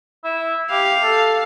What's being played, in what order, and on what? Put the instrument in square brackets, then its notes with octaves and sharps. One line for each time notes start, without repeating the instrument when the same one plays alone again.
[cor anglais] E4
[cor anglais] G4 [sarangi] F5
[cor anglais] A4